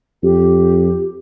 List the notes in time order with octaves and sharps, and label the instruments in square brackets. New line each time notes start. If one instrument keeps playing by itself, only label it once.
[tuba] F2 [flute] G4